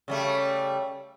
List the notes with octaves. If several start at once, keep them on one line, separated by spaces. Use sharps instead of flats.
C#3 G3 A3